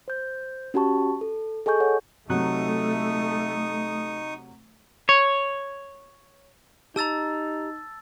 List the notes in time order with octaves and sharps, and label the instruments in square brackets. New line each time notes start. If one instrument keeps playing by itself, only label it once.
[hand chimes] C5 G6
C#4 F#4 G4 A5 C#6
A4
G#4 A4 D#5 G#5 C#6 G6
A4 C#5 F#5
[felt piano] C3 F#3 F#6 [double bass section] A3 [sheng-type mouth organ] D#4 C#6 D#6
[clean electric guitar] C#5
[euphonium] D#4 [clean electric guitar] G4 A#5 [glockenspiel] A5 E6 A6